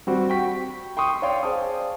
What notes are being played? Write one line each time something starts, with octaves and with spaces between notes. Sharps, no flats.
G3 C4 F#4
G5 C#6 B6
G5 C6 C#6 D#6
C#5 D5 F5 G5 C6
G#4 C5 D5 F5 A5 D#6